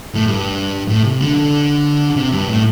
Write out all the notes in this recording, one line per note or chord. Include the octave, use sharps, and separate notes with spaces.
A2
G2
A2
C3
D3
D3
C3
G2
A2